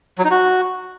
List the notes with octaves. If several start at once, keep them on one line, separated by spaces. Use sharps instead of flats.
F#3
D#4
F#4